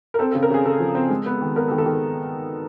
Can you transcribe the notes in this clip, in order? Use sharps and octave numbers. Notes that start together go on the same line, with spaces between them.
A#4
C4 A4
A4
C#3
A#4
C#3 G#4
C#3 A4
F3
C4
G#3
B3
D#3
B3 A#4
A4
D#3
A4
D#3